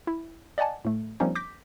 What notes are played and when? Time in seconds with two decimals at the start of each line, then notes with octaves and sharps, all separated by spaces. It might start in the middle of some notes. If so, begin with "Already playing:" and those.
0.07 E4
0.58 D5 D#5 F#5 G#5 A5
0.85 A2 A3
1.20 F3 G3 A#3 C4 C#4 D#4
1.35 D6 G6 A#6 B6